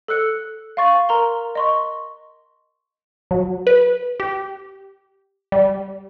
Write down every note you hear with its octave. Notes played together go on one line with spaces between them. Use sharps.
A4 E6 F#6 C#7
F5 C6 C#6 A6
A#4 A#5 C6 G7
D#5 C6 C#6
F#3
B4
G4
G3